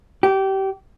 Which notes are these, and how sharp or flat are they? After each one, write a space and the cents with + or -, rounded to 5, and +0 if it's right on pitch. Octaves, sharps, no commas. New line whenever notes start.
G4 -25